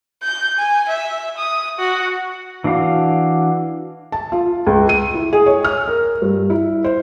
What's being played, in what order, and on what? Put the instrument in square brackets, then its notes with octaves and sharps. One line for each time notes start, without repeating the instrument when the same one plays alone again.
[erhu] G6
G#5
E5
D#6
F#4
[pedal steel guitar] E3 D4 F#4 F5
[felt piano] A5
F4
C#2
D#7
E4
G#4
C#5
F6
A#4
G2
E4
C5